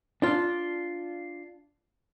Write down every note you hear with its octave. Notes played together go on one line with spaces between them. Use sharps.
D4 F4